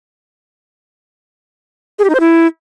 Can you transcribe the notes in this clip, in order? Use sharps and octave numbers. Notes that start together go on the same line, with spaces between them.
G#4
G4
D#4
C5
E4